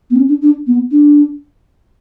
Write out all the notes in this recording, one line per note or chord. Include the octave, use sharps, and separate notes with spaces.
B3
C#4
D4
D4
B3
D4